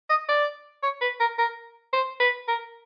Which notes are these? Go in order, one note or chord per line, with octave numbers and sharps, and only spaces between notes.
D#5
D5
C#5
B4
A#4
A#4
C5
B4
A#4